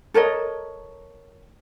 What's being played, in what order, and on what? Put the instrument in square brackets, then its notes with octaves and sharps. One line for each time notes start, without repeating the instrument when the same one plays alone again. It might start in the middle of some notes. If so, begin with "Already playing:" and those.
[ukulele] A4 A#4 C#5 D#5